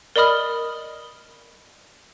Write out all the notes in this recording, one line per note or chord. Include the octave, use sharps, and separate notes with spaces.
A#4 D5 D#5 B5 D#6 F6